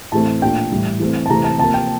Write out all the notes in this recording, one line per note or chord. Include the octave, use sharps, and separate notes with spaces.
A2 E3 A3 C4 A5
A#2 A3 D4 G5
A2 E3 G3
E3 A3 C4
A5
C3 E3 A3 C4 A#5
A5
C3 F3 A#3 A5
G5